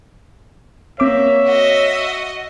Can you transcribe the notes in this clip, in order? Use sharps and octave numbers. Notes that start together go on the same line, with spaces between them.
A#3 C4 C#5 E5 D6
F#4 D#5